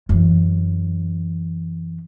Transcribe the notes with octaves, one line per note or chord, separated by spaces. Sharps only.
F#2 E3